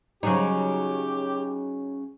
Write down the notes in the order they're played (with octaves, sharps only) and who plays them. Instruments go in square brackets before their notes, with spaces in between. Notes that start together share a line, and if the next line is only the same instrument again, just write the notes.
[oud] C#3 F#3 D#4 [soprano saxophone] G4